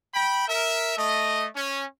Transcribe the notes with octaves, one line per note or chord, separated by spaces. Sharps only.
G5 B5
A#4 E5
A3 D#5
C#4